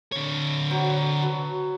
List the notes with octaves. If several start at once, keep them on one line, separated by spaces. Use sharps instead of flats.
D3 C#5
F#3 C5
F#4 B4 A5